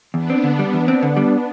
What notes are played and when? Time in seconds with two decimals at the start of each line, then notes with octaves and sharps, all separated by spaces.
0.14 E2 B3 D4
0.30 C4
0.44 D3
0.59 G3
0.73 E2
0.88 C4
1.02 D3
1.17 G3